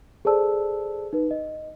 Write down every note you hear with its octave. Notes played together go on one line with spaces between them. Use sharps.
G#4 A4 C5 D5 A5 E6
D#4 B4
D#5